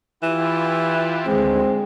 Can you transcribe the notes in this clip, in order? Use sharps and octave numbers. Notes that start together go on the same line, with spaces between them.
E3 E4 F4 G4
D2 D3 D#3 G#3 C4